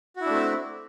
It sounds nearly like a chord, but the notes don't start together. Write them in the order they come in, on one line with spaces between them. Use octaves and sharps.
F#4 E4 D4 A3 C4